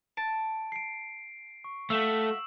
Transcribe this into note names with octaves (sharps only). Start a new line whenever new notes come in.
A5 D7
C7 D7
C#6
A3 F#4 E5 F5 E6 E7 F#7